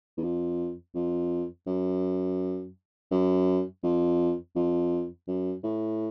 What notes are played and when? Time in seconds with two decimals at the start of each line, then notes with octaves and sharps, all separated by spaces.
0.17 E2
0.23 F2
0.95 F2
1.66 F#2
3.11 F#2
3.83 F2
4.56 F2
5.28 F#2
5.63 A2